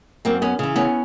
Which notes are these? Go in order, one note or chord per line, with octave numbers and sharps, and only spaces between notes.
F#2 A#3 C4
B3 C#4
C#3 E3
B3 C#4